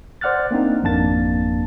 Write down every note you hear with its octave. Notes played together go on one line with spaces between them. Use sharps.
C5 D5 F#5 F6 F#6 A6
A#3 C4 D4 D#4
G#1 F2 A#3 D4 A5 A6